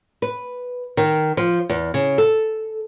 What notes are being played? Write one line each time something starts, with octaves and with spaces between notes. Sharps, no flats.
B4
D#3
F3
E2
C#3
A4